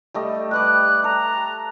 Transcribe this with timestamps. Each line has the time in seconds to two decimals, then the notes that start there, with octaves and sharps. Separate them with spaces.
0.14 G3 A3 D#5
0.51 G3 B4 D6 F#6
1.04 A4 A#5